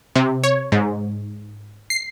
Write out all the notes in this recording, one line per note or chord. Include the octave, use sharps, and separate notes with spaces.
C3
C#5
G#2
C7